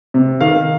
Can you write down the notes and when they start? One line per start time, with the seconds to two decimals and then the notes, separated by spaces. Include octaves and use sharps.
0.14 C3
0.41 D#3 F5